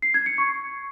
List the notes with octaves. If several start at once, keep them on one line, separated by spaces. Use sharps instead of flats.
C7
G#6
C#7
C#6